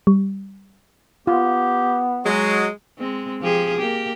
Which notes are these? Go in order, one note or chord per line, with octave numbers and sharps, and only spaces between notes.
G3
B3 F4 G4
F#3 G#3 C#5
G#3 C4
F3 G4 G#4
A#3 G4